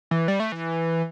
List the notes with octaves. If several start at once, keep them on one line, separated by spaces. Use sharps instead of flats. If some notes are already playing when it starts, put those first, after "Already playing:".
E3
G3
A3
E3